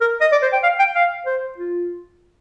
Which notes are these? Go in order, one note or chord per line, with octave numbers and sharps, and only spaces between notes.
A#4
D#5
D5
C5
G5
F5
G5
F5
C5
F4